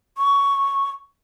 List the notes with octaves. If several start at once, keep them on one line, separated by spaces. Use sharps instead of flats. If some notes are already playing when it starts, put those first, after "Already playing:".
C#6